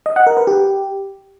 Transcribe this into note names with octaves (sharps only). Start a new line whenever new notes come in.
D#5
F#5
A#4
B4
G4